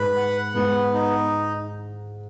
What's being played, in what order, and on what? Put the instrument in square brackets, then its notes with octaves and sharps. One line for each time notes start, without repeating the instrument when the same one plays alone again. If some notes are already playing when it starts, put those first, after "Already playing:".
Already playing: [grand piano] G#2 G#3 [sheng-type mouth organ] B4
[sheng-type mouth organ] F#5
[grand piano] G#2 G#3 [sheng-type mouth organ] B3
[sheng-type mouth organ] D#4